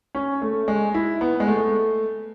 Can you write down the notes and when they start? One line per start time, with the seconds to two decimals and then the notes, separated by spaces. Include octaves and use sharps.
0.15 C#4
0.42 A3
0.68 G#3
0.94 E4
1.21 B3
1.40 G#3
1.47 A3